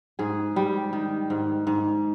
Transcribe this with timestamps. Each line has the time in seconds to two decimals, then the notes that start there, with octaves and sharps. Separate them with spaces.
0.19 G#2 G#4
0.56 G3
0.93 D#3
1.30 G#2
1.67 G#2